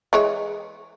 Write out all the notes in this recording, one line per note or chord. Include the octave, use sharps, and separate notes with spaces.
E3 G#3 C#5